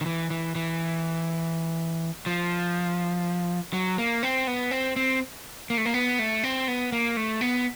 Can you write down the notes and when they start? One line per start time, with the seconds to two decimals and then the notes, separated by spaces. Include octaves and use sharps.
0.01 D#3
0.06 E3
0.30 E3
0.55 E3
2.26 F3
3.73 F#3
3.98 A#3
4.23 C4
4.47 B3
4.71 C4
4.96 C4
5.70 A#3
5.78 A3
5.85 A#3
5.94 B3
6.19 A3
6.44 C4
6.68 B3
6.92 A#3
7.17 A3
7.41 B3